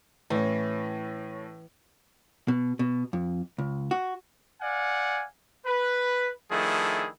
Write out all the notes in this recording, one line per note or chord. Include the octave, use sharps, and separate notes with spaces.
A2 E3 C#4
B2
B2
F2
C#2
F#4
D5 F5 F#5 G#5
B4
D#3 F3 A3 D4 E4 G#4